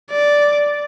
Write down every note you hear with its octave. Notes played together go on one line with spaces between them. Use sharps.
D5